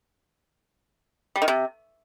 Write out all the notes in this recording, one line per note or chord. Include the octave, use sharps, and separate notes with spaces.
G3
D#3
C3